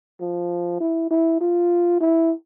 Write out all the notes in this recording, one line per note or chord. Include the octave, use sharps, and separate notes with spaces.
F3
E4
E4
F4
E4